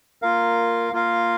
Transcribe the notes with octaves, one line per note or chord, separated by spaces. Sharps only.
A#3 F4 A#4 F5
A#3 F4 A#4 F5